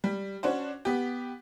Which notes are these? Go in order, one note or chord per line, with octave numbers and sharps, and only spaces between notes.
G3
C#4 D4 F#4 C5
B3 G4